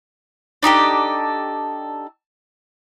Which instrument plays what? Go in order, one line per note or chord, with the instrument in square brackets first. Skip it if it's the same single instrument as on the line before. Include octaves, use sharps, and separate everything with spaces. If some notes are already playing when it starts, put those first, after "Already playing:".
[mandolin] D4 D#4 G4 A4